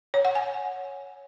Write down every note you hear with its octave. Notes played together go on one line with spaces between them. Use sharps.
C#5
F#5
G#5